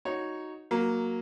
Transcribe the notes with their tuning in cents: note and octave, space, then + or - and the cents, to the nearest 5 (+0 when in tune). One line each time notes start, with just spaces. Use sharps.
D#4 +0 F#4 +0 C#5 +0
F#3 +0 A#3 +0